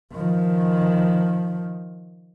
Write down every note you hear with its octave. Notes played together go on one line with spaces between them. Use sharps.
D#3 F3